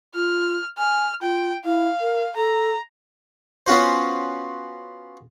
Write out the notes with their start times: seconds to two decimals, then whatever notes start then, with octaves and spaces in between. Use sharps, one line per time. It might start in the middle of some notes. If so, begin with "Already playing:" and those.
0.15 F4 F6
0.78 G#5 F6
1.22 F4 G5
1.65 E4 F5
2.01 A#4
2.36 A4 A#5
3.66 B3 C#4 F4 F#4 C5